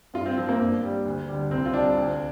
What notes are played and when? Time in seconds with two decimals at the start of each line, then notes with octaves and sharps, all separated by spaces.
0.14 G2 F4
0.26 C4
0.37 F3 C4
0.49 A#3
0.60 G2
0.83 G3
1.05 D2
1.29 D3 G3
1.50 C2 C4
1.66 F4
1.73 C3 G3 D4
1.97 D2